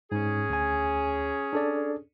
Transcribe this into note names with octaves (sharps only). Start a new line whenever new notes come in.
G#2 C#4 G#4
D2 G#5
D4 A4 D5